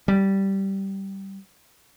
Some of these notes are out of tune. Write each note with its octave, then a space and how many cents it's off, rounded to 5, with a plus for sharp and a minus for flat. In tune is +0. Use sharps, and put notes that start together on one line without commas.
G3 -10